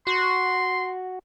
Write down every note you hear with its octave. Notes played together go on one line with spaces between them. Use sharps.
F#4 C6